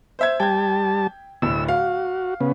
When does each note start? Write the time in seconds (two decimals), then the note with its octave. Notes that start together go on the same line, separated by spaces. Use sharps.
0.19 C5 E5 G#6
0.40 G3 G5 A5 G#6
1.42 D1 A2 E6
1.68 F#4 F5
2.41 C#3 B3